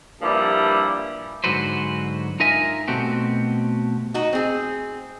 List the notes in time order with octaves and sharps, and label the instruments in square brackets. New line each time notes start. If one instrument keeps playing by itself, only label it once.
[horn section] G2 A#2 F3 G3 E4
[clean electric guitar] G#2 D3 F#3 F#4 B4 C5
D#4 F4 A#4 D#5 E5 G#5
B2 A3 C4 F#4 G4
[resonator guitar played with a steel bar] D#4 F#4
C4 G#4